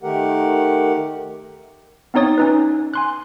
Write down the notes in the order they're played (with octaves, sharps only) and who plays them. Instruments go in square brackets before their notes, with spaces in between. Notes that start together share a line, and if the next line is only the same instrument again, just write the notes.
[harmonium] D#3 A3 G4 A#4 F#5
[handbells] B3 C4 D#4 C#5 D#6 A6
C#4 D#4 B4
G#5 C6 F#6